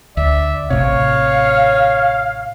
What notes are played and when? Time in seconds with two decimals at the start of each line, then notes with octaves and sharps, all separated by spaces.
0.17 D2 D5 E5
0.70 A1 A2 C3 C#5 F5